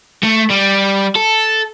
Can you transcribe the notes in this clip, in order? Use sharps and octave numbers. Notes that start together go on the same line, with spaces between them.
A3
G3
A4